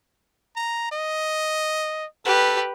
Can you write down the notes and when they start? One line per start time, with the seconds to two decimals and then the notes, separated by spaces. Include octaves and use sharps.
0.56 A#5
0.92 D#5
2.25 G4 A4 B4